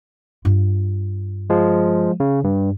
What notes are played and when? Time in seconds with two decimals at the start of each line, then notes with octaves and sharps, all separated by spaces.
0.45 G2 F4
1.50 F3 G#3
2.20 C#3
2.44 G2